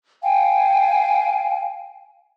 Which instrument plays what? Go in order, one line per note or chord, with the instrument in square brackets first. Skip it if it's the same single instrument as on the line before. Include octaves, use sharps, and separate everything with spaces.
[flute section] F5 G5 G#5